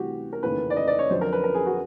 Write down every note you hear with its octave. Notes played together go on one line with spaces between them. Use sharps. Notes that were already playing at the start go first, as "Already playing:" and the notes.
Already playing: D2 C3 E3 G3 F#4 G4
A#4
F1 D#2 C#3 E3 B4
D5
D#5
D5
C#5
F2 D3 F#3 C5
A#4
B4
A#4
G#4
F#4